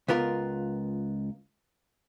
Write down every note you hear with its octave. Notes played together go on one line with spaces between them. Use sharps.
C#2 B3 F4 A#4